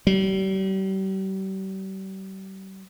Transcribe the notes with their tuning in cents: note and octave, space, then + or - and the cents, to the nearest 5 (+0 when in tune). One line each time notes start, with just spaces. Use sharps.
G3 -40